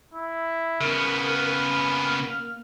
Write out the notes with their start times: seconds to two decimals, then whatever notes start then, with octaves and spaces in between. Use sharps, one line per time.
0.14 E4
0.81 C#3 B3 A#4 F6
1.75 A#3